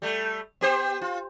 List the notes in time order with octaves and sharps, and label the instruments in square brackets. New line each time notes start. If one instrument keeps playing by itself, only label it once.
[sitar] G3 A3
B3 G4 C5
F4